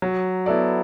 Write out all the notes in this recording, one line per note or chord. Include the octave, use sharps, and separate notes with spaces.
F#3
B3 E4 A4 D5